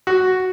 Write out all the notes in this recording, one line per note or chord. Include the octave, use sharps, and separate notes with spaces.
F#4